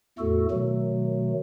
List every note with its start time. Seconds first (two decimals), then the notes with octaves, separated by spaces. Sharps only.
0.19 E2 A2 A3 F#4 A4
0.51 B2 D#3 F#3 A3